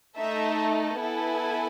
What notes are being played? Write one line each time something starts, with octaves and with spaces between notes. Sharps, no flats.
A3 D#4 A4 E5
B3 E4 A4 G#5